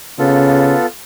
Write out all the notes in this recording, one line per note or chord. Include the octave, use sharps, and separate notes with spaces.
C#3 B3 F4 A4